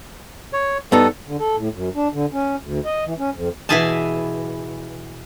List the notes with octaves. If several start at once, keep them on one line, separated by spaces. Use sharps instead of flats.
C#5
G2 B3 D#4 A4
D3
A4
A2
F#2
D4
D3
C#4
D2
D#5
E3
C#4
F2
B2 E3 E4 G#4 G#5 A5